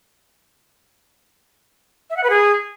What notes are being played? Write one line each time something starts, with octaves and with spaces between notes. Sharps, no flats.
E5
F#5
B4
G#4